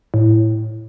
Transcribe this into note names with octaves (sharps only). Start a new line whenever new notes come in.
A2